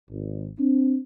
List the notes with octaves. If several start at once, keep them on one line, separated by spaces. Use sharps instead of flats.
G#1
C4 D4